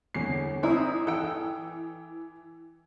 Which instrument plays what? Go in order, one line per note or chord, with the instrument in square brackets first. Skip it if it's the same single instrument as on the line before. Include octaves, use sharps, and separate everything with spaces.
[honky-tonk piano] G1 E2 C7
[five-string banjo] C4 E4 [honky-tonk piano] D5 A#5 D#6
[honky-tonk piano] E3 E6 [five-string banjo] A4 G5